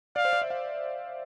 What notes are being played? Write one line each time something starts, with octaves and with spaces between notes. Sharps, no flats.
D5 F5
C5
D5
E5
F5